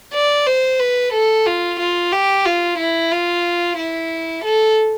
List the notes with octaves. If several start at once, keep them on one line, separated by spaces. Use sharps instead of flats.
D5
C5
B4
A4
F4
F4
G4
F4
E4
F4
E4
A4